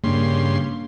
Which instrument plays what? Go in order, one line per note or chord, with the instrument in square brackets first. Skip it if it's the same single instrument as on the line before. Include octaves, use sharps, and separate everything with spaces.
[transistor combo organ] G2 C#3 C6 [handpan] A#3 D4